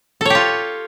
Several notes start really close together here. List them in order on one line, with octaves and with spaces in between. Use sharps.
A4 C#5 G4 F4